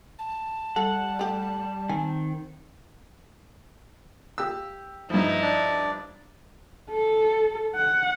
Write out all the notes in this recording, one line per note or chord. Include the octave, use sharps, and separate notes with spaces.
A5
G3 A4 F#5
A3 G4
D#3 C4 G#5
G4 E6
G2 F3 D#4 E4
D4 D5
A4
F#5